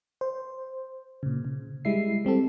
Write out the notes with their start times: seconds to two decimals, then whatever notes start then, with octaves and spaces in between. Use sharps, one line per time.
0.21 C5
1.23 A#2 C#3
1.45 C#3
1.85 G3 G#3 E4 E5 C7
2.25 G3 C4 G4 A4